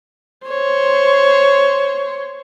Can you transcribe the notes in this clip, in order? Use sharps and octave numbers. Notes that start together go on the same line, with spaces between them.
C5 C#5